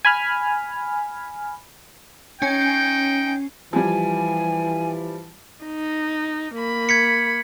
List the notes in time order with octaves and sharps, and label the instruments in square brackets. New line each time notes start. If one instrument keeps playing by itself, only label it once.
[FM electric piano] G#5 B5 F6
[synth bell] C#4 G#5 C7 [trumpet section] D#4 G5
[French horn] E3 [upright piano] F3 G3 [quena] G#5
[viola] D#4
A#3 B5
[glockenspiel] G#6 B6 C#7